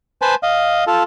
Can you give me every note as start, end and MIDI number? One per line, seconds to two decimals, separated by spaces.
0.22 0.35 71
0.22 0.35 72
0.22 0.35 80
0.22 0.35 81
0.22 0.35 83
0.43 0.84 75
0.43 0.84 77
0.87 1.03 65
0.87 1.03 69